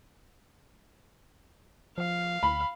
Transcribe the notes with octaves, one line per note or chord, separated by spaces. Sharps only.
F3 F5
D2 B5